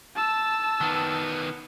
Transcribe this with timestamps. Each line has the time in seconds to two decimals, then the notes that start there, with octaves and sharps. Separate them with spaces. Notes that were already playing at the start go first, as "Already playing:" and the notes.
0.16 A5 E6
0.81 D#3 B3